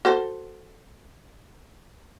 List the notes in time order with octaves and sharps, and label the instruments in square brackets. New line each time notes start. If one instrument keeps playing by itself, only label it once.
[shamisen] F#4 A4 C5